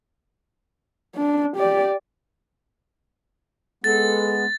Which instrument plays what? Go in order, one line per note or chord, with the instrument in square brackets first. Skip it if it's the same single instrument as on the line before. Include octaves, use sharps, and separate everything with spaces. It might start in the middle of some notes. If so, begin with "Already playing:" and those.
[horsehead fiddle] D4
G4 D5
[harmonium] G#3 B3 [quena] A4 [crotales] A6